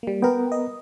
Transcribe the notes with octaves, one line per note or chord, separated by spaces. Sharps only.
G3 A#3
B3 A#4 B4 G5
D#5